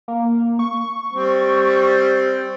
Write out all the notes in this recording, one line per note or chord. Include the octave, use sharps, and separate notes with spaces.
A#3
C#6
G3 C4